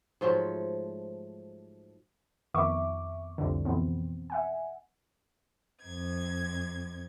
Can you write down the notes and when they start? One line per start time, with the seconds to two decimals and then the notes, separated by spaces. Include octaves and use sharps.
0.21 G#2 F3 F#3 A3
2.54 F2 D#3 B3 E5 C#6 D6
3.38 C2 F2 A2 D3
3.65 F2 B2 E3 B3 C4
4.30 E5 F#5 G#5
5.81 F2 G#6